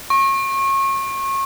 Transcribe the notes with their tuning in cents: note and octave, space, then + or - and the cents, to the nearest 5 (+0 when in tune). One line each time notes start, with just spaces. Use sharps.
C#6 -30